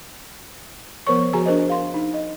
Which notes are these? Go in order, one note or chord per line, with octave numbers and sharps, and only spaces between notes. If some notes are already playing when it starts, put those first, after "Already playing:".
F3 B3 A#4 C5 C#5 C#6
F3 F#4 G#4 G#5 A#5
D4 A#4 C5 D#5
G#4 F5 C6
D#4
D#5